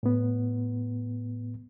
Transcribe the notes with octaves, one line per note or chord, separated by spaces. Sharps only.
A2 B3